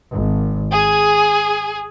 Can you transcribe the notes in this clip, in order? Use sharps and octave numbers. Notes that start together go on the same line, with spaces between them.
G#1
G#4